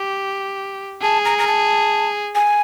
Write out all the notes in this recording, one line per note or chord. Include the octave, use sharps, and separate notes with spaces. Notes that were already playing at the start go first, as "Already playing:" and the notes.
Already playing: G4
G#4 A5
A#5
A#5
A5
G#5